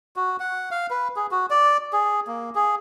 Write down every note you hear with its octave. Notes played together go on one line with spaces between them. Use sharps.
F#4
F#5
F5
B4
G#4
F#4
D5
G#4
A#3
G#4